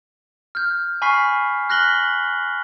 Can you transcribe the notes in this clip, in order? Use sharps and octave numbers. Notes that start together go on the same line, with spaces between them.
F6 G6
G#5 B5 C#6 F6 B6 C7
F6 F#6 A#6 B6 F#7 G7